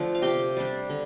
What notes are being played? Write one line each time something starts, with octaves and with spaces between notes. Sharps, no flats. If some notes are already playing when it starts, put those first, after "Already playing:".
Already playing: D3 F3 A3
F5
C3 G4 G5
G3 D4
D3